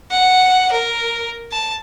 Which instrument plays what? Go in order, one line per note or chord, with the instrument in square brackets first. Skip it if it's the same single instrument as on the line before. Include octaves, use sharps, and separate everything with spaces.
[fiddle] F#5
A#4
A5